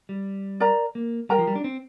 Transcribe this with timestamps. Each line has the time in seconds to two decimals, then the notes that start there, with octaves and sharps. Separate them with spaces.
0.09 G3
0.60 A#4 D5 A#5
0.95 A#3
1.29 G3 A#4 G5 A#5
1.39 F3
1.47 G3
1.55 D4
1.64 C4